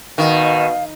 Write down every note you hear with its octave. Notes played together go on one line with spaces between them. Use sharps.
B2 D#3 F5